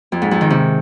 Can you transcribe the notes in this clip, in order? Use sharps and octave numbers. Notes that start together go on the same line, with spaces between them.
F2
G#2
F2
D#3
C3